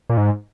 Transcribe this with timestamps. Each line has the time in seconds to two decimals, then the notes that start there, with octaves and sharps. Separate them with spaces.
0.10 A#2
0.17 G#2